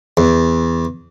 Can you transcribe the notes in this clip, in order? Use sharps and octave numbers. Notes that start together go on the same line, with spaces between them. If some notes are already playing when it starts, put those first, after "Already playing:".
E2